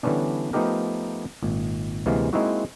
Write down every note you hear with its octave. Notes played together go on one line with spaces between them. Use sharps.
D3 E3 G3 B3 C#4 D4
F3 A3 B3 D#4 G4 A#4
G#1 A#2
D2 C3 E3 G#3 A#3 F5
G#3 A#3 C4 D#4 E4 F#4